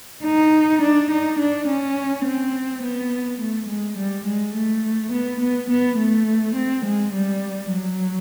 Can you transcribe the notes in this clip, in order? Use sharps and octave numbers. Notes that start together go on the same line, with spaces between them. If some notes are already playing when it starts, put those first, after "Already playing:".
D#4
D4
D#4
D4
C#4
C4
B3
A3
G#3
G3
G#3
A3
B3
B3
B3
A3
C4
G#3
G3
F#3